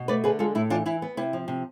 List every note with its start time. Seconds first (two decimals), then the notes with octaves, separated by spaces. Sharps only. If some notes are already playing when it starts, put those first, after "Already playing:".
Already playing: B2
0.08 A3 B4 D5
0.24 D3 G#4 B4
0.39 G#3 F4 A4
0.55 A2 E4
0.70 E3 D4 F4
0.86 E3 E4
1.02 B3
1.17 C3 E4
1.33 F3
1.48 C3